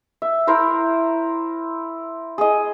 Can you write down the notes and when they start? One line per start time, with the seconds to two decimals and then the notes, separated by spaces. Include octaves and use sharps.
0.22 E5
0.47 E4 A#4 C5
2.38 G#4 D#5